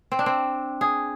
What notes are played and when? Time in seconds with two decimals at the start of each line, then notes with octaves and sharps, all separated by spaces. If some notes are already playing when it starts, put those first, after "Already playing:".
0.12 C4
0.19 D4
0.26 C4
0.81 G#4